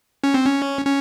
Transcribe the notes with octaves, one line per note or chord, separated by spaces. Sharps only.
C#4
C4
C#4
C#4